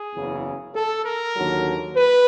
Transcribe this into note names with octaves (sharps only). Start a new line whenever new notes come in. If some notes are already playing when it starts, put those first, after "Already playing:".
Already playing: G#4
F#1 E2 C#3
A4
A#4
D#2 D3 F#3
B4